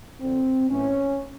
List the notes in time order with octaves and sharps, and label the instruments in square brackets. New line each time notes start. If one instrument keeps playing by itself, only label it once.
[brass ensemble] F2 D3 C4
A2 E3 C#4